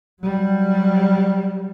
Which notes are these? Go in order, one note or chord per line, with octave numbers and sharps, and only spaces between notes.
F#3 G3